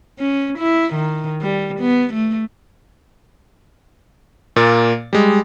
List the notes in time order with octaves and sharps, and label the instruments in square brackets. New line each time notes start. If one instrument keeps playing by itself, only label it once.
[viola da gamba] C#4
E4
D#3
G3
B3
A3
[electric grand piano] A#2 A#3 A6
G3 G#3